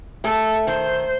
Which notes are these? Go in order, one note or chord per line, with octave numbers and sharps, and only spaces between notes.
A3 A4
D#3 C5